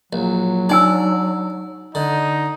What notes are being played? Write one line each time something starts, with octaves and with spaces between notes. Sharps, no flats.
A#1 F#3
D4 D#4 G#5 E6
D3 D#4